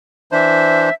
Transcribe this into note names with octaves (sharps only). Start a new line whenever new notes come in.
E3 D4 C5 E5